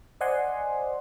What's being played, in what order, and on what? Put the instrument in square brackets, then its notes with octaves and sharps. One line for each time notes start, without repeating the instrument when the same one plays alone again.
[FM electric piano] C5 D5 D#5 F#5 G#5 C6